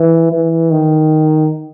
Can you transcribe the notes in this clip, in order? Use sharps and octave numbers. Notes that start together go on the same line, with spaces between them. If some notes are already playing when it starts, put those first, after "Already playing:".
Already playing: E3
E3
D#3